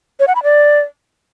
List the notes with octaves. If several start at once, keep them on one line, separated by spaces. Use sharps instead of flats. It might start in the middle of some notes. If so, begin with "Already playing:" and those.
C#5
F#5
B5
D5